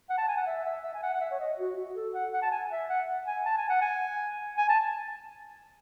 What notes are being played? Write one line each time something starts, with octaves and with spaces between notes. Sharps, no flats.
F#5
A5
G#5
F#5
E5
E5
E5
G#5
F#5
F#5
E5
C#5
D#5
F#4
F#4
A4
F#5
F#5
A5
G#5
E5
F#5
F#5
G#5
A5
G#5
F#5
G#5
G#5
A5